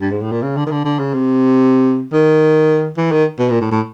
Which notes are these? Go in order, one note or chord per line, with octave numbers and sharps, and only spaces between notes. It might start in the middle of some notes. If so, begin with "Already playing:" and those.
G2
G#2
A2
A#2
C#3
D3
D#3
D3
D3
C#3
C3
D#3
E3
D#3
B2
A#2
A2
A2